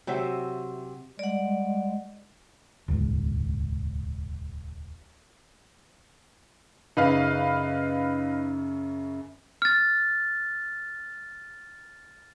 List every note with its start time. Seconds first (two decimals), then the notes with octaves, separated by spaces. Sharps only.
0.07 C3 F#3 C5 E5
1.19 G3 G#3 D5 F#5
2.88 D#1 C#2 G#2
6.97 F#2 C#3 D#4 B4 F5
9.62 F6 A6